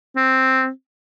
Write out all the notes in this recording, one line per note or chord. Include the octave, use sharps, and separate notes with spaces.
C4